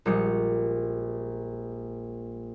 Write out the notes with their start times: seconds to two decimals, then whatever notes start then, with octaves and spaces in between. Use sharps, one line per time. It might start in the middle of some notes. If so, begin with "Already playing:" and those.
0.05 A#1 G3 G#3 C#7